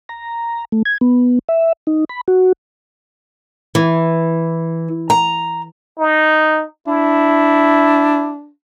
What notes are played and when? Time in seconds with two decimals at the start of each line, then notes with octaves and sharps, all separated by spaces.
0.09 A#5
0.72 A3
0.85 G#6
1.01 B3
1.49 E5
1.87 D#4
2.09 B5
2.28 F#4
3.75 E3
5.10 A#5
5.99 D#4
6.88 D4 E4